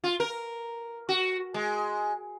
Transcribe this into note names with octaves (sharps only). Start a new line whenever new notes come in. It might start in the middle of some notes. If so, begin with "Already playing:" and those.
F4
A#4
F#4
G#3